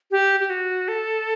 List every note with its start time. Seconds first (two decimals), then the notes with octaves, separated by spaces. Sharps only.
0.11 G4
0.40 G4
0.50 F#4
0.88 A4